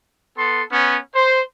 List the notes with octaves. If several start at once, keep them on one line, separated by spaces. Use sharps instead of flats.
B3 A4 C6
B3 C#4
C5